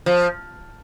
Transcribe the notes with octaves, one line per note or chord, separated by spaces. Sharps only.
F3